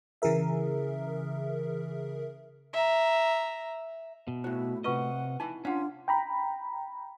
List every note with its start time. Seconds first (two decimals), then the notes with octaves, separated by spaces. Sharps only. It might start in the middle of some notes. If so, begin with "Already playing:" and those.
0.22 C#3 E3 G#4 A#4 E5
2.73 E5 A#5
4.28 B2
4.44 A2 E4 F#4 C5
4.84 C3 F4 B4 D#5 F#5 C#6
5.40 D#4 E4 G#5
5.65 C#4 D4 F4 F5 F#5
6.08 G5 A#5 B5